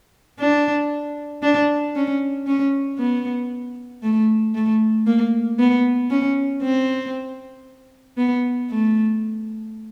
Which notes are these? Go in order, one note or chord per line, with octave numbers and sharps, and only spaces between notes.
D4
D4
C#4
C#4
B3
A3
A3
A#3
B3
C#4
C4
B3
A3